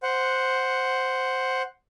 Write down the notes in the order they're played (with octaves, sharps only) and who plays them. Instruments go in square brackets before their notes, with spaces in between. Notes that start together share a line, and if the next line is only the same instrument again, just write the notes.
[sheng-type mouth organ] C5 F#5